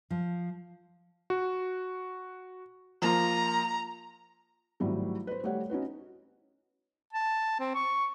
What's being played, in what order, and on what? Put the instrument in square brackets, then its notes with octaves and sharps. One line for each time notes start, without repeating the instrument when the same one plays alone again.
[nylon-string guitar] F3
[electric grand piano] F#4
[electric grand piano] F3 A#3 F4 [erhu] A#5
[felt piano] G#1 A2 F#3 G3
B4 C5
G3 A3 G4 C#5 F#5
C#4 D#4 F#4 B4
[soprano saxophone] A5
C4
C#6